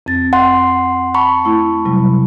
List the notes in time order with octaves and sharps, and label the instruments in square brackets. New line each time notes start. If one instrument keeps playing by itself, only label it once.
[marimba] F2 C4 A6
[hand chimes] F#5 C6
A5 B5 C#6
[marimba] A3 E4
C3 F#3 G3